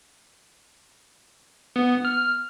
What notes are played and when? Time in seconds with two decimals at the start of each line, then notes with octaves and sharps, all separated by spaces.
1.76 B3
2.05 F6